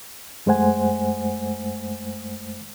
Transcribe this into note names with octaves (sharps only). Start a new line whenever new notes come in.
F#2 G#3 A3 C5 F#5 G#5